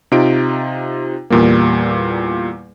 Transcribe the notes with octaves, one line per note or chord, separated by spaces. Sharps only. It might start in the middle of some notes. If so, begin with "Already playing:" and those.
C3 D#4 F4 D7
E2 A#2 G3 A#3